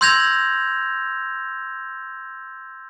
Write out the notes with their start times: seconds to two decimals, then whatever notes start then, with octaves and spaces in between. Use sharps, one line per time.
0.01 C6 E6 G6 G#6 A#6 F7